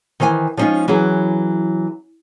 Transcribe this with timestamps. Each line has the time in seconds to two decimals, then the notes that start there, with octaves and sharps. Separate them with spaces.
0.20 D#3 E3 C5 C#5 G#5
0.57 F3 G3 G#3 C#4 D#4 F4
0.88 E3 F#3 C#4 G#4